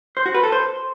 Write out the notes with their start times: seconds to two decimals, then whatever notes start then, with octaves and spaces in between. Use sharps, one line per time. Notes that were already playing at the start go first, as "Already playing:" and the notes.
0.17 C5
0.26 F#4
0.34 B4
0.43 A4
0.52 C5